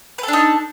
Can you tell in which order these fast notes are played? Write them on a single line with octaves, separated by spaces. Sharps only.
B4 A4 D4 D#4